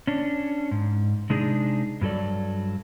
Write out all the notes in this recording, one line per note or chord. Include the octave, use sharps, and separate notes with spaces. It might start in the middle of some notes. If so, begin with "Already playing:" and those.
C#4 D4
G#2
C3 G#3 D4 D#4 G#4
G2 F#3 A4 D5